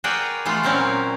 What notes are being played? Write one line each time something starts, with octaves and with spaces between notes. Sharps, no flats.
F#4 G#4 A#4 B4 D5 G5
E3 G#3 A3 B3 F4
A#2 F#3 C4 C#4 A#4